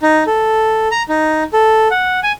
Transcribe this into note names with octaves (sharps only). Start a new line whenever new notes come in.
D#4
A4
A#5
D#4
A4
F#5
G#5